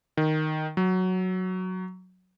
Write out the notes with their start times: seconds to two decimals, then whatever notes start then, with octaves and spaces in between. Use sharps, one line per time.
0.17 D#3
0.77 F#3